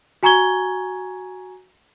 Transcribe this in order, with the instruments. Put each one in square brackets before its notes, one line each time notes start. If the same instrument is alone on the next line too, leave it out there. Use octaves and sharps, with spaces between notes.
[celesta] F#4 G#5 A#5 C#6 G#6 G7